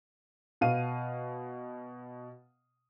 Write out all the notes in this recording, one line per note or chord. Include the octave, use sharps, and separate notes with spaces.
B2 F5 D#7